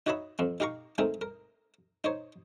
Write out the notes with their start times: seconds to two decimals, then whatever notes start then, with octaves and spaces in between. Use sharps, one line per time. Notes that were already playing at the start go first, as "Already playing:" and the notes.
0.07 D#4 F#4 C#5 D#5 E5 B5
0.39 F2 C4
0.60 D#4 G4 F5 A#5 C#6
0.98 G#3 A3 C4 D#4 A#4
1.21 A#4
2.04 D#4 C5 C#5